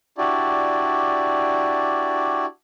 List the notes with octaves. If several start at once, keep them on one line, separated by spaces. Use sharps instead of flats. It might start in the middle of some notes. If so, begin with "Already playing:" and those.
D4 E4 F#4 G4 D5